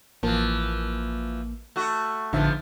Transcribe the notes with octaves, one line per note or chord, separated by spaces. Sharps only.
A1 E3 F3 A#3
A3 F#4
A1 G#2 D3 F3 B3 E5